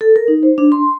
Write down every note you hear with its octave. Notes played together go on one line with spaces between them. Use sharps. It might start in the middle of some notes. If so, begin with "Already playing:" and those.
A4
A#4
D#4
C5
D4
C6